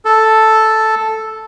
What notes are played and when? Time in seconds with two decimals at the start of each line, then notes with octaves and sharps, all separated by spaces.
0.05 A4